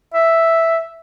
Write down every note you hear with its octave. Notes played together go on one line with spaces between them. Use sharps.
E5